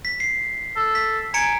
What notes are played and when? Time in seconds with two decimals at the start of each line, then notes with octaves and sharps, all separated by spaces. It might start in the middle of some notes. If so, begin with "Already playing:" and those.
0.05 B6
0.20 C7
0.76 A4
0.95 B6
1.34 G#5 A#5 C#7 D7